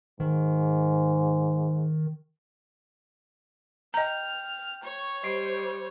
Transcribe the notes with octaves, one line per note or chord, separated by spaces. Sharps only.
G#2 D#3
D#5 G5 A#5 F6 G6
C#5 C#6
G3 C5 D#5 C#6 C7 D7